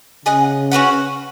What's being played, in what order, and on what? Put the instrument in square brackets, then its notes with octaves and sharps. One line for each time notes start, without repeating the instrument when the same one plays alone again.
[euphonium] C#3 [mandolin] G#4 D#5 F#5
[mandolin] C#4 F#4 B4 F#5